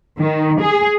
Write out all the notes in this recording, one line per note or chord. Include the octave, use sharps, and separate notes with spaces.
D#3
G#4